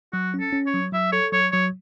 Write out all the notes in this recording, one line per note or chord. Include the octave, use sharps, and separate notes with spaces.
F#3 F#4
C#4
A4
C#4
C#5
F#3
F#3 E5
A4 C#5
F#3 C#5
F#3 C#5